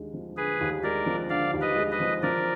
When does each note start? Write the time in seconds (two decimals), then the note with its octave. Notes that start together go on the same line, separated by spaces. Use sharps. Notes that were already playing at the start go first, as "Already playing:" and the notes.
Already playing: D#2 D3 G#3
0.13 F3
0.37 D3 G#4 B4
0.61 D#2
0.83 G#3 A#4 D5
1.06 F3
1.29 D3 D5 F5
1.53 D#2
1.61 B4 D#5
1.76 G#3
1.91 B4 D#5
2.00 F3
2.23 F3 A#4 D5